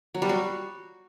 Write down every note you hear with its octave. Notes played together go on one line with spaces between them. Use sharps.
F#3
G3
F#4